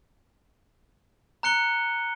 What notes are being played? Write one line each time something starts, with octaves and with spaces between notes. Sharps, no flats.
A#5 F#6 C#7 G7